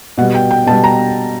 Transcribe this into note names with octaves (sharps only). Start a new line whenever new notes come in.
B2 G3 F#5
G5
G5
B2 G3 A5
A#5